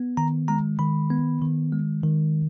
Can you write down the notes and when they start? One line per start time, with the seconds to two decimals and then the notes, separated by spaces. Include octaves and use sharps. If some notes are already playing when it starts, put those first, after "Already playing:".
Already playing: B3
0.17 D#3 A#5
0.48 G#3 A#5
0.79 D#3 B5
1.10 B3
1.42 D#3
1.72 G#3
2.04 D#3